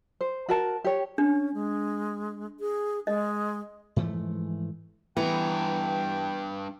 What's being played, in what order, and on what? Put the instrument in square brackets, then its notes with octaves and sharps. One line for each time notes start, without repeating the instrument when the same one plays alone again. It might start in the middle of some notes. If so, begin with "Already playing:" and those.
[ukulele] C5
F#4 A#4 A5
G4 C#5
[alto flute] C#4 [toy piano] D4
[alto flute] G#3
G#4
[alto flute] G#3 [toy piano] D#5
[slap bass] G#2 E3 F3 A3
[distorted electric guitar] G2 A#5 [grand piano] E3 [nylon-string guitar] B3 [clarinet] G5